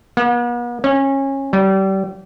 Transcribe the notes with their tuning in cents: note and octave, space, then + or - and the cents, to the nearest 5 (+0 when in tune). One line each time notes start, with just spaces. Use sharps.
B3 -45
C#4 -25
G3 -30